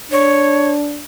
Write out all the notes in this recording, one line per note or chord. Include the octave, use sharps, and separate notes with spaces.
D4 C#5